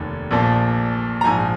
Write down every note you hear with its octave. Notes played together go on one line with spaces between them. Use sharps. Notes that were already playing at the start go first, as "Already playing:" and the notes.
Already playing: F1 D#2 D#3
A#1 A#2 F3
A#5
A#1 G#2 F3 G#5